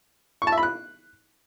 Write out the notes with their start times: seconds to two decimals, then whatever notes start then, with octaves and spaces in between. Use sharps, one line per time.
0.42 C#6
0.47 A5
0.52 E5
0.58 B5
0.63 F#6